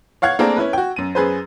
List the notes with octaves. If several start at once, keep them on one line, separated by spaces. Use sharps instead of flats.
C#5 F5 F#5 G#6
A3 A#3 C4 D4 G#4 A#4
C#4 E4 B4
F#4 G5
F#2 D#7
F#2 G#4 B4 C5